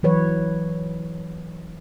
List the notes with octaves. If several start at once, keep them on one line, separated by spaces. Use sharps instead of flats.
E3 F#3 B4 C#5